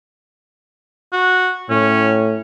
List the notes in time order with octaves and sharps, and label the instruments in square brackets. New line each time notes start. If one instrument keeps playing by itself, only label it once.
[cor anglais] F#4
[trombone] A2 [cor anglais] C#4